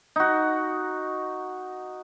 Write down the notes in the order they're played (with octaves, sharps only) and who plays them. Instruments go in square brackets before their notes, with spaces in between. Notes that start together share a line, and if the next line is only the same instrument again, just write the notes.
[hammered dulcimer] D#4 F#4